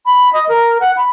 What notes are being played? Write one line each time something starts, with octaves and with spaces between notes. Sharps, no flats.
B5
D#5
A#4
F#5
B5